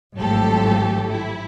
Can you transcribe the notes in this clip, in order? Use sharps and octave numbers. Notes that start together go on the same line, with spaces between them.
G#1 A2 F3 F#3 G4 A4
E4